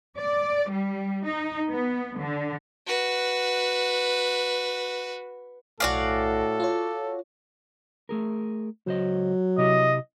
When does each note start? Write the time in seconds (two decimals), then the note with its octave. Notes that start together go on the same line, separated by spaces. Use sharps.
0.17 D5
0.71 G3
1.26 D#4
1.70 B3
2.18 D3
2.87 F#4 B4
5.80 B1 A2 F#4 A4 D5 F5 G#5
6.60 F4 C#5
8.09 A3 G#4 A#4
8.87 C#2 F#3 C5 D#5
9.58 C3 E4 G4 D#5